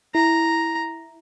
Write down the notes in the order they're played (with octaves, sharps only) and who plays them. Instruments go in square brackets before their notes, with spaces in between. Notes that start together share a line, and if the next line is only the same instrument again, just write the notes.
[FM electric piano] E4 [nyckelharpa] A#5